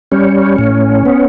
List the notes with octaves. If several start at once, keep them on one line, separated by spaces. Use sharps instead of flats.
G3 C#4
A2
B3